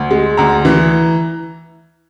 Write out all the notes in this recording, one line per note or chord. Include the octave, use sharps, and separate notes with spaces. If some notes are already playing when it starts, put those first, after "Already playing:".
Already playing: D2
G#3
D2 A#5
E3